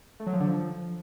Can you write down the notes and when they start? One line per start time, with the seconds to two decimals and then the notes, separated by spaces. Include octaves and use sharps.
0.20 A3
0.27 F#3
0.33 F3
0.40 D3
0.47 F3